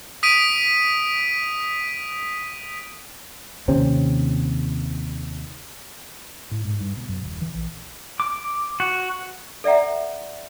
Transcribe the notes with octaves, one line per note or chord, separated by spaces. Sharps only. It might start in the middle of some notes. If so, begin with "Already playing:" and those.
D#6 B6 D7 D#7
D#2 C3 C4 C#4
A2
G#2
G2
B2
F#2
D#1
E3
A#1
D6
F#4
A4 D5 E5 F#5 A#5